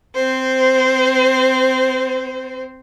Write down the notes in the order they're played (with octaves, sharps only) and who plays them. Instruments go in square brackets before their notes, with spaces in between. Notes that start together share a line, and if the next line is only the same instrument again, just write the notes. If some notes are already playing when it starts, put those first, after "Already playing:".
[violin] C4 C5